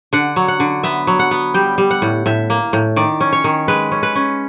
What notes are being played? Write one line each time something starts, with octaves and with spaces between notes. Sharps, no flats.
D3 F#5
F#3
F#5
D3
B3 E5
F#3
F#5
B3
G3 G5
G3
F#5
A2
A2 E5
A#3
A2
D#3 D5
C#4
C#5
D#3
G#3 B4
C#4
B4
C#4